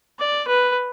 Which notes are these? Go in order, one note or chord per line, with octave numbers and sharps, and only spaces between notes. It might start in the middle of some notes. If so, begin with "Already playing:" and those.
D5
B4